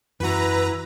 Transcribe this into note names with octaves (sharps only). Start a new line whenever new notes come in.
F#2 E3 E4 F#4 B4 A#5